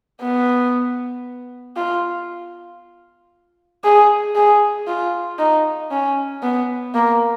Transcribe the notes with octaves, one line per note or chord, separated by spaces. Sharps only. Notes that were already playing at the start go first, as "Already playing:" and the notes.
B3
F4
G#4
G#4
F4
D#4
C#4
B3
A#3